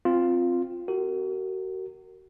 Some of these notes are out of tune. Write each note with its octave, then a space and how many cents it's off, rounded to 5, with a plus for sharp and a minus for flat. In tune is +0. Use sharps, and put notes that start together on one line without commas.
C4 +0 F4 +0
F#4 +35 A#4 -25